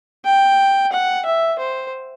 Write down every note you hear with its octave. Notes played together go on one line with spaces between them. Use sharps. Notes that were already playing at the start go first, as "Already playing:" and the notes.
G5
F#5
E5
C5